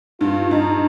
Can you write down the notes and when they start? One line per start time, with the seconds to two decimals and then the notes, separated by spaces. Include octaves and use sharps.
0.20 G2 F4
0.51 G2 D#4